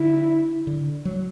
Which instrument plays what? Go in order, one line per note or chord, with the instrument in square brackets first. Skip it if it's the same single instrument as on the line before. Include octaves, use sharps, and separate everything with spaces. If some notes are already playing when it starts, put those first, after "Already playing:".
Already playing: [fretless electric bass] D3 [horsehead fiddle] E4
[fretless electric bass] D3
F#3